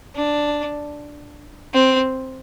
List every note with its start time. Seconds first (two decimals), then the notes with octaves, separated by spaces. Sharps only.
0.15 D4
1.74 C4